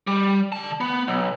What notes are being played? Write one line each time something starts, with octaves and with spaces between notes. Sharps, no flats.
G3
D3 A5
B3
B1